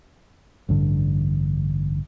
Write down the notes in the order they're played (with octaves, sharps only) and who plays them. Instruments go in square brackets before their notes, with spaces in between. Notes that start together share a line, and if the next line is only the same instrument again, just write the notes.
[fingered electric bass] A1 G2 D3